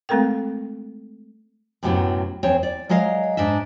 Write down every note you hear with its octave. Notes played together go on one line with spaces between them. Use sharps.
G#3 A3 C4 A4 A#4 G5
F#2 A2 C3 F#3 B3 E4
E2 C4 C#5
D5
F#3 G#3 A#4 D#5 F5
G#2 D4 D#5 E5